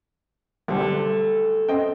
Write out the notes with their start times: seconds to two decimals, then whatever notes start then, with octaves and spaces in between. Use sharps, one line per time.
0.68 B1 D3 G3 A3 G4 C5
1.68 C4 C#4 D#5 G5